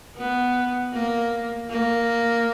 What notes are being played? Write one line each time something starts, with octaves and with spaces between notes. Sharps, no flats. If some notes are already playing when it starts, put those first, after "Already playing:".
B3
A#3
A#3